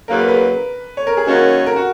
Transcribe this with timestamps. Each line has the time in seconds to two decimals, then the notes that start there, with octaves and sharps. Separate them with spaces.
0.08 E2 C#3 F#3 A#3 A#4
0.18 B4
0.28 B4
0.97 C#5
1.07 A#4
1.17 G#4
1.27 F#2 D#3 A#3 C#4 F#4
1.66 A#4
1.76 F#4